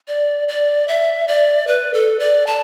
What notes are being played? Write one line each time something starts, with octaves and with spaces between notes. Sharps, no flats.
D5
D5
E5
D5
B4
A4
D5
A5